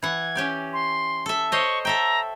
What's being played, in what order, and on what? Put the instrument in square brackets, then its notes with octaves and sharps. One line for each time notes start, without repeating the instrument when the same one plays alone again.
[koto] E3 F#5 [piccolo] G#6
[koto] C#4 G4 D5
[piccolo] C6
[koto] A4 E5
[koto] C5 C#5 D#5 [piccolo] C#6
[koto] A4 E5 G5 [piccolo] A#5